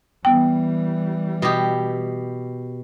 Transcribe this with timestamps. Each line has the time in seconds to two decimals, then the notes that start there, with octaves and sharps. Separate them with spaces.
0.25 E3 G3 B3 G5
1.42 B2 G4